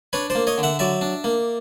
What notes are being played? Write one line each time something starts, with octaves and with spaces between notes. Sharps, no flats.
D4 B4 C#5
C5 D5
A#3
C#5 D#5
D3
E5 F#5
F#3 D5 E5
D4
A#3